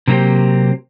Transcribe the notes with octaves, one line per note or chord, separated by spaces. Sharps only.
C3 F#3 A#3 C4 G4